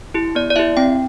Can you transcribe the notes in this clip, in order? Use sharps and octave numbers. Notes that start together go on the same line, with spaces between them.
E4 G4
B3 D5
D5
E4 G4 E5
C4 G5